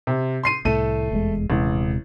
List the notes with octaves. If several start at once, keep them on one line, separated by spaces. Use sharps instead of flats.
C3
C6 C7 D#7
C2 A2 A3 A4 D#7
F1 E2 G#3
D#1 A1 C3 G#3